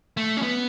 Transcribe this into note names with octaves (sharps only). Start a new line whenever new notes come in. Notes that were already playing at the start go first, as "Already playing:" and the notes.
A3
C#4
B3